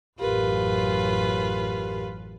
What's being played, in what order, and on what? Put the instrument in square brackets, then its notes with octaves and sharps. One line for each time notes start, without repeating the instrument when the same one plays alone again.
[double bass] A1 F#2 [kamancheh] F4 B4 [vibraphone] G4 A#4